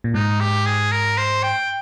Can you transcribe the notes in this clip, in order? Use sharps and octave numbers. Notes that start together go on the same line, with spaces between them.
A#2
G#2 D#4
G4
G#4
A#4
C5
G5